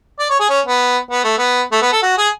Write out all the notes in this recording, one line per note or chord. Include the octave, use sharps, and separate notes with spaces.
D5
C#5
G#4
C#4
B3
B3
A3
B3
A3
B3
A4
F#4
G#4